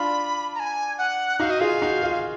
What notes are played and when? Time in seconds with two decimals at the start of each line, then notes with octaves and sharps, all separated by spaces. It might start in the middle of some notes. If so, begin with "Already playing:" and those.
Already playing: D4 F4 B5
0.55 A#5
0.59 G#5
0.98 F#5
1.40 D#4 F#4 F5
1.50 D#5
1.60 F4 G#4 F5
1.82 D#4 F#4
2.03 F4 G#4